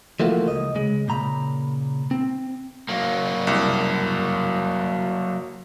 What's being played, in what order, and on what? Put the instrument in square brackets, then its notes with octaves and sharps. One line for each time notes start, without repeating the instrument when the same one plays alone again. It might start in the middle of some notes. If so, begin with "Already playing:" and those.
[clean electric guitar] E3 F3 A3 A#3 F#4
C#2 D#5
C#3 G#3
A#2 C#3 A#5 B5
C4
[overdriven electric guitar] F#3 A#3
[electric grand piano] C2